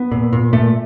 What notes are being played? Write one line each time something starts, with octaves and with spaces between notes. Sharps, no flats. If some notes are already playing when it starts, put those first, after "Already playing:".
Already playing: B3
A#2
A#2
A#2 A3